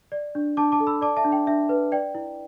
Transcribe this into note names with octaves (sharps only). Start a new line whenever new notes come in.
D5
D4
D4 A5 D6
A5 D6
A4
B5 E6
D5 A5 D6
E5 A5
D4
G5
D4 E5
B4
D5 G5
E4